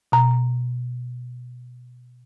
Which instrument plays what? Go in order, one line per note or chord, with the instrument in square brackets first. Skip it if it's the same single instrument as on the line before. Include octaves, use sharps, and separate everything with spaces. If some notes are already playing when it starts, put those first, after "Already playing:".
[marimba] B2 A#5